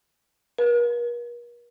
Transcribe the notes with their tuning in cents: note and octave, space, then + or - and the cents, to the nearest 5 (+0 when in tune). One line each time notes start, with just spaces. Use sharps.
A#4 +45